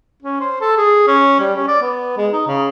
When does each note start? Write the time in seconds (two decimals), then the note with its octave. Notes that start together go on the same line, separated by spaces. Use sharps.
0.23 C#4
0.40 C5
0.61 A4
0.77 G#4
1.07 C#4
1.40 G3
1.56 C#4
1.68 D5
1.82 B3
2.17 G#3
2.33 D#4
2.47 C#3